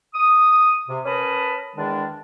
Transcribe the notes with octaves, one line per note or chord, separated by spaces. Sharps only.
D#6
C3
C#4 A#4 B4 A5 B5 D#6
E2 D#3 G#3 D4